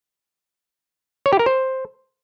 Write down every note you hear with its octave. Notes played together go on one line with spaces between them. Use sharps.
C#5
G4
A#4
C5